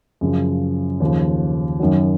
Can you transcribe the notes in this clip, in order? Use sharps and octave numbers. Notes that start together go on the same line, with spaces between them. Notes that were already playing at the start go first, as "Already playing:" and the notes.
F#2 C#3 F3
D#2 C#3 F3
F#2 D#3 F#3